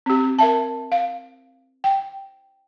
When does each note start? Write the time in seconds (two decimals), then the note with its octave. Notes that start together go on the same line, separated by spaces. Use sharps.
0.06 C4 G4
0.39 A#4 E5 A5
0.92 F5
1.84 G5